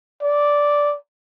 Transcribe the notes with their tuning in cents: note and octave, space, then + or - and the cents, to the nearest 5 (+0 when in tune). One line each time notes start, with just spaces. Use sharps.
D5 -5